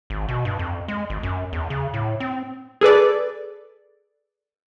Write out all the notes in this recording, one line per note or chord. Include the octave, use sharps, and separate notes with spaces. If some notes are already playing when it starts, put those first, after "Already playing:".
G#1
B2
G2
F2
G#3
G#1
F#2
E2
C#3
A2
C4
G#4 A4 B4 D5